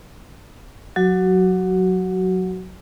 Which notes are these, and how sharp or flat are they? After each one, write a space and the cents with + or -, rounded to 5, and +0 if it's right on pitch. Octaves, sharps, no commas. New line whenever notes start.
F#3 -15 F#4 +20